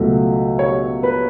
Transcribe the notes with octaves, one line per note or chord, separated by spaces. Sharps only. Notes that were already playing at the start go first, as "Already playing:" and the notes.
Already playing: C#2 B2 F#3 A3
C#5
B4